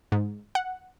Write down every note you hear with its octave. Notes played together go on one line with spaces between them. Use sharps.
G#2
F#5